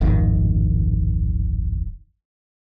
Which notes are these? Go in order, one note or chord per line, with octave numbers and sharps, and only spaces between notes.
D1 G#1 F2 D#3